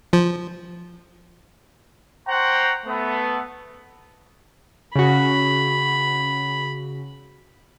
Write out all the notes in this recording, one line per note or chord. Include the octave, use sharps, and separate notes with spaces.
F3
C5 F#5 G5 A#5 C6 C#6
A3 B3
C#3 F#4 B5